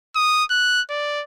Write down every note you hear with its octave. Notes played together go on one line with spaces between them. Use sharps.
D#6
F#6
D5